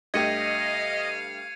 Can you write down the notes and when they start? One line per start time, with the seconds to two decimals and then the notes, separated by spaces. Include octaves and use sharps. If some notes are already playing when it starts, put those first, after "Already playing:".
0.14 G2 A3 G4 D#5 F5 G#6 C#7 D#7